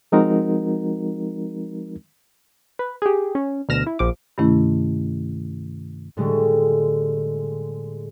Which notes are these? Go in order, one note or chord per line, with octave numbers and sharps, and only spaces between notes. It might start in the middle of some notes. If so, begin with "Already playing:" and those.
F3 G#3 C4 D#4 F#4 A#4
B4
G4 G#4
C#4
D2 B2 F6 A#6 E7
E4
A#1 F3 D6
G2 C3 D#3 A3 C#4 E4
A2 D3 G3 G#3